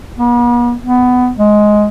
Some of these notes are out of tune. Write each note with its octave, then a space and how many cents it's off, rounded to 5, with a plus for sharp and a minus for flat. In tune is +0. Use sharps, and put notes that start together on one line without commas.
B3 -45
B3 +15
G#3 +10